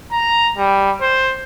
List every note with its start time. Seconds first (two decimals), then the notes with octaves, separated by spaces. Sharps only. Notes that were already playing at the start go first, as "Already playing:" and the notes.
0.12 A#5
0.57 G3
1.01 C5